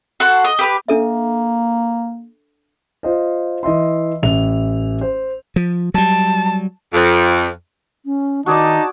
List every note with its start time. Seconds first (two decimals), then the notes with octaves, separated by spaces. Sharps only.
0.20 F#4 A4 F#5 C6
0.44 D#5
0.59 G4 B4 F6
0.88 A#3 D4 A4 E5
3.03 F4 C5 D#5
3.63 E3 D#5 E5 C6
4.23 A1 E5 F7
5.01 C5
5.56 F3
5.94 F#3 G3 A5
6.94 F2
8.05 C#4
8.46 D#3 D#4 F#4 G#4 D5 A5